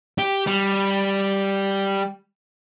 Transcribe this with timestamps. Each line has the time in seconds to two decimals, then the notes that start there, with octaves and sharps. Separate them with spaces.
0.18 G4
0.47 G3